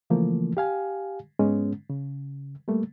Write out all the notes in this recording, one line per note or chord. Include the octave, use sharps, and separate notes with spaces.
C#3 E3 F3 A3 A#3
G4 F5 G#5
G#2 G#3 B3 C#4
C#3
G3 A3 A#3